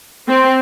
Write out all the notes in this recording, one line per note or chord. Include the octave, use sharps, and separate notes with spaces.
C4